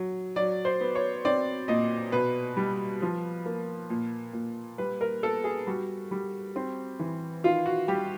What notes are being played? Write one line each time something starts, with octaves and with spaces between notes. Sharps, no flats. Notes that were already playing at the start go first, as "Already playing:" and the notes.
Already playing: F#3
F#3 D5
C5
B3
C#5
C4 D5
A#2 D#5
B2 B4
G3
F3
A#3
A#2
A#2
G3 B4
A#4
B3 A4
G#4
G3 F#4
G3
C4
E3
D#3 F4
F#4
G3 G4